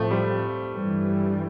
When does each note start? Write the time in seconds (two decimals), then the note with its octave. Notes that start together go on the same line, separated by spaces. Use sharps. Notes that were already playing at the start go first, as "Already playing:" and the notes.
Already playing: A2 F3 A3 C4
0.11 G3
0.73 G2 E3 G3